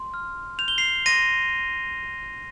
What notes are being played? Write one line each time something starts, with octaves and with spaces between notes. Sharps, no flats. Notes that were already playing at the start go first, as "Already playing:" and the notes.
Already playing: C6
F6
G6 F7
G7
C7 F7
C6 A#6 D#7